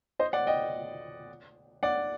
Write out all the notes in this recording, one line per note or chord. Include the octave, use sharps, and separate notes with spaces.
C5 D#5
D5 F#5
D#5 G5
D5 F#5